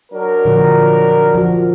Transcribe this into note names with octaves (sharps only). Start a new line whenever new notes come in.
F#3 D4 A#4
A#2 D3 F3
F3 F#4